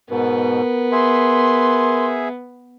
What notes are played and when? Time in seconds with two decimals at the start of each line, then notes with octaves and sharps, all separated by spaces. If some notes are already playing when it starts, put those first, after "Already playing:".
0.11 G#2 B2 B3 A#4
0.92 G#4 E5 C6